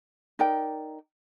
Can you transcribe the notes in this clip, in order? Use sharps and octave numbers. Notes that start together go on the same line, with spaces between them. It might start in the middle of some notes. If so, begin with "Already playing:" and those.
D#4 A#4 D5 G5